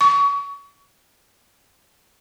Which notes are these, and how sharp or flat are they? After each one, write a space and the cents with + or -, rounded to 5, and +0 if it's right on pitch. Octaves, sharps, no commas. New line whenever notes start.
C#6 +30